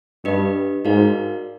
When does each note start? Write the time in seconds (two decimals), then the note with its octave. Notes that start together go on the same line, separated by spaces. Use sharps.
0.25 G2 D4 G4 B4 D#5
0.85 G#2 D#4 F#4 A#4 D5 F5